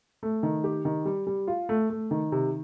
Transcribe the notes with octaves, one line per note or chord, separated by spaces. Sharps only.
A3
D#3
G4
D#3
G3
G3
F4
A3
A3
D#3
C3